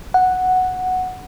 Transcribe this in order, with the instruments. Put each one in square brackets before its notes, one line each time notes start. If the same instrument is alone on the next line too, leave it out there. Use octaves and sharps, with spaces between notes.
[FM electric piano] F#5